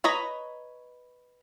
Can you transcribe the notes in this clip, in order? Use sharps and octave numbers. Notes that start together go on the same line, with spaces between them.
B4 C#5 D#5 A#5 B5